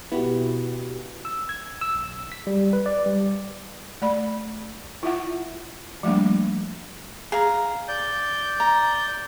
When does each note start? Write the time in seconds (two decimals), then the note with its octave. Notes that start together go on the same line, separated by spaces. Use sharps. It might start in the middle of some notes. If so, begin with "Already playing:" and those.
0.12 B2 B3 E4 F#4 G4
1.25 E6
1.49 G#6
1.81 E6
1.95 B1
2.32 B6
2.47 G3
2.73 B4
2.86 D5
3.06 G3
4.02 A3 D5 B5
5.03 E4 F4 E5 F#5
6.03 F3 G3 A3 A#3 D4
7.32 G#4 F5 A#5
7.88 D5 G6
8.60 A#5